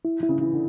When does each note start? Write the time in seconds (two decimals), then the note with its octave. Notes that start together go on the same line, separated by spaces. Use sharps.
0.05 E4
0.23 E4
0.29 C#3
0.41 E3 E4
0.53 D3